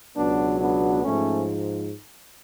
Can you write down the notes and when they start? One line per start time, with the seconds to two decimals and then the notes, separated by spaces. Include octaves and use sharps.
0.16 C#2 B2 F#3 B3 D4
0.60 B3 D4
1.04 G#2 F3 A3 C#4